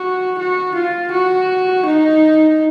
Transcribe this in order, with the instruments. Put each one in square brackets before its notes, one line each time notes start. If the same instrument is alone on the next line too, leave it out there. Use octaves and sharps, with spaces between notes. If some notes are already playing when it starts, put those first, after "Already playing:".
Already playing: [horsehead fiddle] F#4
F#4
F4
F#4
D#4